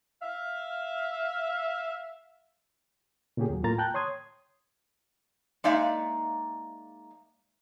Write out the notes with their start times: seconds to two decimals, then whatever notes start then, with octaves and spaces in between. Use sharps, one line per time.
0.22 E5 F5
3.37 A#2 C#3 A#3 C#4 G4 G#4
3.49 D#2 F#3
3.64 A2 A#3 F4 A#5 A6
3.78 G5 A5 A#5 F#6 G6
3.94 C#5 C6 D#6 G#6
5.64 G#3 A#3 D#4 D5 E5 F5